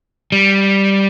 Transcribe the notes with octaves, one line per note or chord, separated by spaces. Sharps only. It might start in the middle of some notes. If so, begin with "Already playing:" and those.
G3